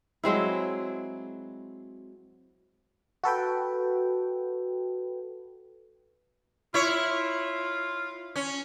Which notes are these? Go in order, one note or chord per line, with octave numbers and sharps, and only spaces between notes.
F#3 G#3 C4 E4
F#4 A4 B4 G5
E4 F4 C#5
C#4